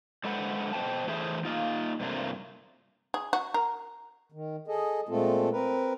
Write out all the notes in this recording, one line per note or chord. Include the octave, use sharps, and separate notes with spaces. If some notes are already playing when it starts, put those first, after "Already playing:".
D3 G#3 A4 B4 C5 F#5
B2 C5 G5 A5
E3 A3 G#4 C5 E5
A#3 D#4 F4
G2 C3 A3 A#3 F4
G#4
F#4
A#4
D#3
G#4 A4 D#5
A#2 G#3 A3 C4 F4 A4
C4 A#4 B4